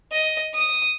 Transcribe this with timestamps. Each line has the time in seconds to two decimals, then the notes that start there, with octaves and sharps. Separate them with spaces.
0.12 D#5
0.54 D#6